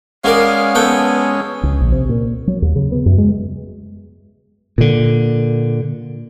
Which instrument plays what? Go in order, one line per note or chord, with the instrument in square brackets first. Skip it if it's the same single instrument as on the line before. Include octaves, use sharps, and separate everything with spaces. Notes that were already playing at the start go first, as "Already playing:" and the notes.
[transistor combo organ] G#3 C#4 [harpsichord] B3 A#4 D5 [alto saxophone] F5
[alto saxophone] B3 [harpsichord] A4 G5 C#6
[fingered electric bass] C#2
A#1
C3
A#2
F#3
D#2
C#3
B3
F#2
G#3
[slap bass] A#2 D3